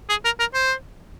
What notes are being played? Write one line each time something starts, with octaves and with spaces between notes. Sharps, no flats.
G#4
A#4
A#4
C5